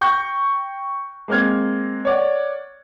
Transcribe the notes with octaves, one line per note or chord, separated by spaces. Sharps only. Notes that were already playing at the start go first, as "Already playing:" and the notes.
G5 C#6 G6 A#6
G#3 A#3 C4 F6 G#6
C#5 D5 F#5